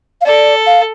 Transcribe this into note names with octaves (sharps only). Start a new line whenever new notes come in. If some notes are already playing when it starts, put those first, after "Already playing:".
F5
A4 D5
F5